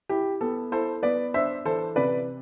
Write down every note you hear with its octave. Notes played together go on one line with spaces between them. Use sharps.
E4 G4
B3 A4
E4 A4 C5
B3 B4 D5
D4 C5 E5
E3 A4 C5
C3 B4 D5